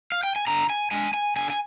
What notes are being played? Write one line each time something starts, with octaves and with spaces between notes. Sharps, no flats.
F5
G5
G#5
D3 A#5
G#5
G#3 D4 G#5
G#5
D3 G#5
G#5